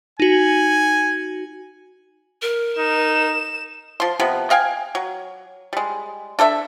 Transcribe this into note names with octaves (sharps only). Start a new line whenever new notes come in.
D#4 F#4 G#5
A#4
D#4 E7
F3 C6
C3 F3 B3
D#5 F5 G5 G#5
F#3
G3 G#3
D4 A4 C5 E5